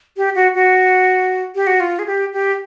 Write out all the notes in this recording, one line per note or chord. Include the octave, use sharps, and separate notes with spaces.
G4
F#4
F#4
G4
F#4
F4
G#4
G4
G4